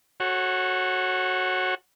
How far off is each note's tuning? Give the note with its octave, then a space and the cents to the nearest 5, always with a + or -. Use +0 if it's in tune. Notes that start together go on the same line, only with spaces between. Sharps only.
F#4 +0 A4 +0 C#5 -25